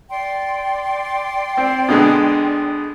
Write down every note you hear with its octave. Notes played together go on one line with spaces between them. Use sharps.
D5 G5 C6
C4
B2 D3 G#3